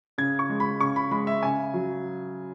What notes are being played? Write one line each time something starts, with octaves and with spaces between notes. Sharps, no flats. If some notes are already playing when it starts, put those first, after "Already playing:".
C#3 G#6
C#6
G#3
B5
C#3 C#6
B5
G#3 B5
E5
C#3 G#5
F#3